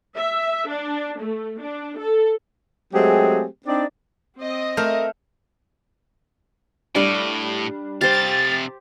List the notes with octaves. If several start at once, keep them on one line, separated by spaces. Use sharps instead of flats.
E5
D4
A3
D4
A4
F#3 G#3 A3 C4 G4 G#4
C4 D4 D#4 D5
C4 D#5
A3 A#4 F5 F6 G6
A2 G3 D4 D5 F5
C3 G4 C5 F5 A6